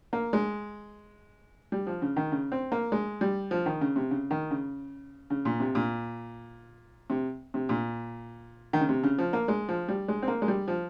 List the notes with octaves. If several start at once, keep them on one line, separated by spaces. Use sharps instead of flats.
A#3
G#3
G3
F3
C#3
D#3
C#3
C4
A#3
G#3
G3
F3
D#3
C#3
C3
C#3
D#3
C#3
C#3
A#2
C3
A#2
C3
C3
A#2
D#3
C#3
C3
C#3
F3
A#3
G#3
F3
G3
G#3
C4
A#3
G#3
G3
F3